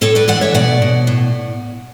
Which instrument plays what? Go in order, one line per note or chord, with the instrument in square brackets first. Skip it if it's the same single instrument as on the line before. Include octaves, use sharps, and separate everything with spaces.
[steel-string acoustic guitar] A2 A4 C#5
B4 D5
E3 D5 F#5
C#5 E5
B2 D5 F#5
B2
A2